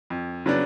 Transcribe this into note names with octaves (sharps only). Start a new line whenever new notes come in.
F2
C#3 F#3 B3 D4